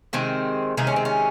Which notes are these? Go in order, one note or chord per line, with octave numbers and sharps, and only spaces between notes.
C3 D#3 G#3 C4
C3 D#3 G#3 D#4
C#4
C4
C#4